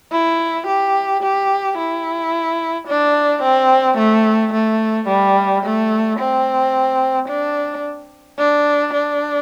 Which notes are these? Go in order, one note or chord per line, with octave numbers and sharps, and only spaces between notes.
E4
G4
G4
E4
D4
C4
A3
A3
G3
A3
C4
D4
D4
D4